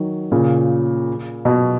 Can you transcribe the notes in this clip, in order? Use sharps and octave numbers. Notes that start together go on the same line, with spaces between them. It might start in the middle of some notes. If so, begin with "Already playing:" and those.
Already playing: D#3 F#3
A#2 C#3
B2